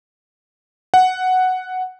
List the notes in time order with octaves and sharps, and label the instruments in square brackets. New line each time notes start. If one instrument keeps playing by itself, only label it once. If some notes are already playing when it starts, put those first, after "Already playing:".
[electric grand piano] F#5